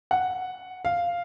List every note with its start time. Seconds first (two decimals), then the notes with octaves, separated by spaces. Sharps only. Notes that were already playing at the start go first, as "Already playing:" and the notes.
0.11 F#5
0.85 F5